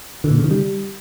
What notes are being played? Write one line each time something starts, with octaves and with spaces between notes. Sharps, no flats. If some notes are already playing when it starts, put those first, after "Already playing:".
D3
A#2
C#3
D#3
G3